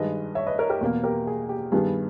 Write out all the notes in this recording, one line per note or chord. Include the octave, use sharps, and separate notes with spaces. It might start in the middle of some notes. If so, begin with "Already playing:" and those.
Already playing: G2 D#3 G#3 B4 D#5
C#5 E5
B4 D#5
A#4 C#5
G4 A#4
E2 B2 A#3
G4 A#4
G#4
G4
G2 D#3 G3 B3 G#4